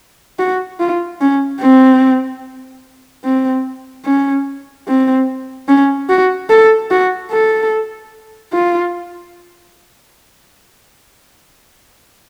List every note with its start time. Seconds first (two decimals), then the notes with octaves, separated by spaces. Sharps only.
0.39 F#4
0.80 F4
1.21 C#4
1.61 C4
3.24 C4
4.06 C#4
4.87 C4
5.68 C#4
6.09 F#4
6.50 A4
6.91 F#4
7.32 A4
8.53 F4